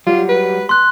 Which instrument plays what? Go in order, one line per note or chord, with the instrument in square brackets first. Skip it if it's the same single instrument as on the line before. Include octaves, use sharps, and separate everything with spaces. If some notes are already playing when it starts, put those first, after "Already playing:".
[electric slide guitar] F#3 G3 [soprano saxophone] F4
[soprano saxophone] B4
[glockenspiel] C6 F#6